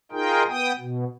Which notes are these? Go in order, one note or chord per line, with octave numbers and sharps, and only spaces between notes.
D#4 F4 G#4 A#4 G5
B3 G5 D#6
B2